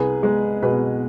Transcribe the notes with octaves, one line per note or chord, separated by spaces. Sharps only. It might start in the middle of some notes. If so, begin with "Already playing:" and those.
Already playing: C2 G#4 B4
G#3
B2 G#4 B4